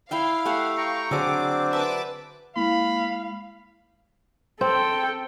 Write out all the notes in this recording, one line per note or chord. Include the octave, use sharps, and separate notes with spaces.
E4 E5 F5 G5
A3 G4 E5 F#5
G5 A#5 C#6
D3 F#3 C4 D4 G#4 D6 E6
B4 E5 A5 D6
G#3 A#3 E4 F5 B5
C4 A4 G5